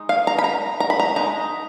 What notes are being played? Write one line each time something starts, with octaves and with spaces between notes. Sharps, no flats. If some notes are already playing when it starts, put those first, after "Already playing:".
Already playing: G#3 D#4
F5
A#5
B5
A#5
A#5
B5
A#5
G#3 D#4 A#5